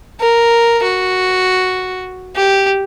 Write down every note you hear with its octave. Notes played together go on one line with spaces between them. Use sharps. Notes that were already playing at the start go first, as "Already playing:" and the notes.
A#4
F#4
G4